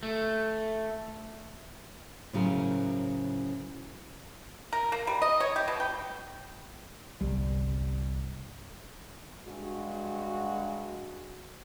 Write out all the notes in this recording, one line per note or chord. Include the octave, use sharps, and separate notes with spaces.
A3
A2 C#3 F#3 A#4 C5
A#4
A#3
G3
D#5
C#5
G4
B2
G5
G1 C2 G3
G2 G#3 F#4